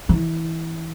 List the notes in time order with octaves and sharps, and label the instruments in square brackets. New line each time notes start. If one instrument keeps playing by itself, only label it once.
[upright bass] E3